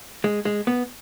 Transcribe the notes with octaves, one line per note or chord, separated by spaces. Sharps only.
G#3
G#3
B3